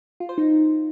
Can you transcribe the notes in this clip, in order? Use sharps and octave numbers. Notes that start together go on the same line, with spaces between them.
F4
C5
D#4